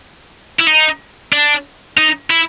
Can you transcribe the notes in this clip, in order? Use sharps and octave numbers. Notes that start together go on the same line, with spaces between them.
E4
D#4
D4
D#4
E4